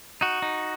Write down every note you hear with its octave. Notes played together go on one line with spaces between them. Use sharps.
D#4 F#4
D#4